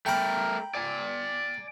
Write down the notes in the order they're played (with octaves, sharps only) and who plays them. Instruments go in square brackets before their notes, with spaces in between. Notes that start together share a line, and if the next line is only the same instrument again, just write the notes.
[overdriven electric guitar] A3 A#4 [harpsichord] G5 A#5 B5
[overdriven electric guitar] D5 G#5